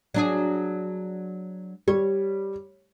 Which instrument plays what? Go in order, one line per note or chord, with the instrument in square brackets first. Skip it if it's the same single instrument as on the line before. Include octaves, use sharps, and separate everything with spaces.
[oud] F#3 D4 G#4
[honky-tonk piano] G3 [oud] C#5